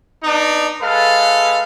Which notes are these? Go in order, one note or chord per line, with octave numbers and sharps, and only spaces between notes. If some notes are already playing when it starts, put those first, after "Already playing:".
B3 D4 D#4
G#3 A4 B4 F5